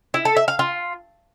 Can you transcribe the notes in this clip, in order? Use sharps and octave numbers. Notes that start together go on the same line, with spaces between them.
E4
A4
E5
F5
F4